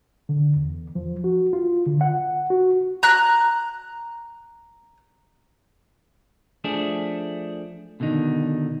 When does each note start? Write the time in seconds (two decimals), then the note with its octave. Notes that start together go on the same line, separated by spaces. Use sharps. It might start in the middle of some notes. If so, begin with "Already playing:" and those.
0.29 D3
0.56 E2
0.95 F3
1.24 F#4
1.53 F4
1.86 D3
2.01 F#5
2.50 F#4
3.03 A#5 F#6
6.64 F3 A3 D4 G#4
8.00 B2 D3 D#3 D#4